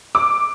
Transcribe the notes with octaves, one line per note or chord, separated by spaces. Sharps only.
D6